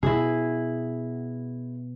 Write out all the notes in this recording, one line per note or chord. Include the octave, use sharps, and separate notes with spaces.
B2 B3 E4 G#4